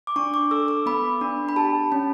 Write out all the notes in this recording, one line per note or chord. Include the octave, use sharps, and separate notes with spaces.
D6
D4 C#6
D6
A4 E6
D6
B3 B5
D4
B5
G4 A5
C#4